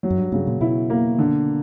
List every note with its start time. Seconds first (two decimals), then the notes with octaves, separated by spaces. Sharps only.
0.03 F#3
0.10 F#2
0.18 G2
0.32 G2 C#3
0.47 A#2
0.61 B2 E4
0.90 A#3
1.19 D3